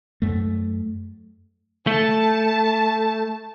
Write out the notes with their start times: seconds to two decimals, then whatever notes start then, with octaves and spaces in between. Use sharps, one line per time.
0.22 F#2 A3
1.87 A3 A5